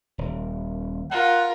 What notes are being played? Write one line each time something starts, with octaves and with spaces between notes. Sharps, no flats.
D#1
F4 A#4 F#5